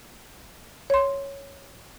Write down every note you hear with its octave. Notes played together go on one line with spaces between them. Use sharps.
C#5 C6